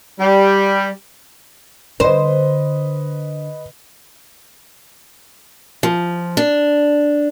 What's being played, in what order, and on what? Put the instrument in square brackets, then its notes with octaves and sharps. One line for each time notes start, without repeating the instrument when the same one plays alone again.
[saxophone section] G3
[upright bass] D3 [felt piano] B4 D#5 [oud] C5
[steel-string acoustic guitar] F3
D4